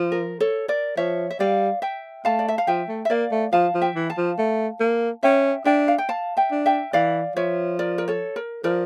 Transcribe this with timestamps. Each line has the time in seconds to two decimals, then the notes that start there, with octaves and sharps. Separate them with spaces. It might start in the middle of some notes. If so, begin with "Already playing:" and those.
Already playing: F3
0.12 A#4
0.40 A4 C#5
0.68 A#4 D5
0.97 F3 C#5 E5
1.30 E5
1.40 G3 D5 F5
1.82 E5 G5
2.25 A3 F5 A5
2.39 D5
2.48 E5
2.58 F5
2.67 F3 E5 G5
2.88 A3
3.05 E5
3.10 A#3 D5 F5
3.32 A3
3.53 F3 F5 A5
3.75 F3
3.82 E5 G5
3.95 E3
4.10 F5 A5
4.17 F3
4.38 A3
4.80 A#3
5.23 C#4 E5 G5
5.65 D4 E5 G5
5.88 F5
5.98 G5
6.09 F5 A5
6.37 E5 G5
6.51 D4
6.66 E5 G5
6.93 E3 D5 F5
7.36 F3 C#5 E5
7.79 A#4 D5
7.98 A#4
8.08 A4 C#5
8.36 A#4
8.64 F3 A#4 D5